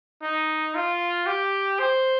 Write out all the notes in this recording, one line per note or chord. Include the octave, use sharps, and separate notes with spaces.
D#4
F4
G4
C5